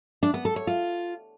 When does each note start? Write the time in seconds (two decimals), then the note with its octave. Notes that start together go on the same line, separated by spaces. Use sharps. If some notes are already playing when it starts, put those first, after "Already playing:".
0.23 D4
0.34 B3
0.45 A4
0.56 C#5
0.67 F4